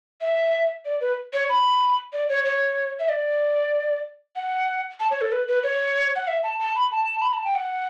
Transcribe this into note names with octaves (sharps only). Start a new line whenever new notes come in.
E5
D5
B4
C#5
B5
D5
C#5
C#5
E5
D5
F#5
A5
C#5
A4
B4
B4
C#5
F#5
E5
A5
A5
B5
A5
B5
A5
G5
F#5